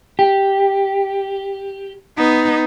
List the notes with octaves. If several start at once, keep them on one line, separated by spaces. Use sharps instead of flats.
G4
B3 D#4